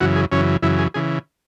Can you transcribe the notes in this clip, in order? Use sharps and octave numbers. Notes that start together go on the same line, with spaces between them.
F#2 C#3 E3 F#4
G#4
F#2 C#3 E3 C#4
F#2 C#3 E3 E4
G#4
C#3 E3 G#4